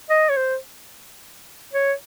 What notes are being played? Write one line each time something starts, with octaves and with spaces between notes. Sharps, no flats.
D#5
C#5
C5
C#5